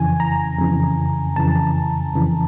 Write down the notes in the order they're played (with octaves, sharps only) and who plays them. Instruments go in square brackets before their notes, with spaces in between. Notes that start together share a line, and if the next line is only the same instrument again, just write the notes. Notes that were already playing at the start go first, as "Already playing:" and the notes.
Already playing: [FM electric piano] F2 C#3 E3 G#5
A#5
F2 C#3 E3
F2 C#3 E3 A5
F2 C#3 E3